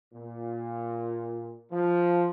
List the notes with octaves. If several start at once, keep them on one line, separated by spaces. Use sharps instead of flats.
A#2
F3